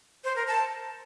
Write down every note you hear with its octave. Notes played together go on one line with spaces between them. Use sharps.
C5
A#4
A5